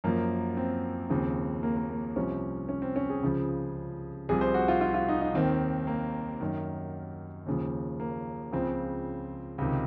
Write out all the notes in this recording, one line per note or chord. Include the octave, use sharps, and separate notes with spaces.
F#2 F3 A#3
C4
D#2 C#3 F3 C4
A#3
A#3
A#3
C2 C3 F3 C#4
C#4
C4
C#4
G#4
C#2 C#3 F3
C2 C3 F3 G#4
C5
F#4
F4
F4
F4
D#4
D#4
D#2 D#3 C4
A#3
F#2 D#3
D#2 C#3 F3
A#3
C#2 C#3 F3 C4
C#2 C3 D#3